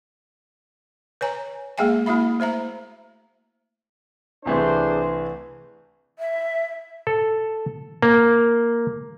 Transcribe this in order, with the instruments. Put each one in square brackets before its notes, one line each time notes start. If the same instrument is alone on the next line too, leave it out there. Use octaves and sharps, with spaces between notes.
[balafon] B4 C#5 G#5 A#5
G#3 A#3 G#4 E5 G5 G#5
A#3 E4 F#4 E5 B5
A3 C5 E5 A#5
[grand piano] C2 E3 A3 [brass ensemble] D4 G#4 C5
[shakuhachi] E5
[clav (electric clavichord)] A4
A#3